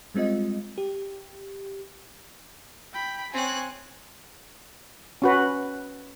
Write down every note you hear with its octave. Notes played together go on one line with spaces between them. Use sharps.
G3 G#3 C4 F4 D#5
G4
G5 B5
C4 C#5 G#5 F#6
C#4 F#4 B4